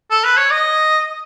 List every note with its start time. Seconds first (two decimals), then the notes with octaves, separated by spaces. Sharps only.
0.11 A4
0.24 B4
0.37 C#5
0.51 D#5